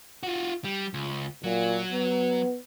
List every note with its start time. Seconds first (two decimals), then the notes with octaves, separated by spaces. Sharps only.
0.23 F4 F#4
0.64 G3
0.94 C#2
1.44 A#2 F#3
1.92 B3